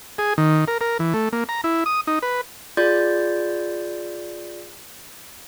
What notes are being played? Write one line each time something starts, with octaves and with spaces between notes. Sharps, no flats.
G#4
D#3
A#4
A#4
E3
A3
A#3
A#5
E4
D#6
D#4
B4
F4 G#4 D5 C6 G6 A6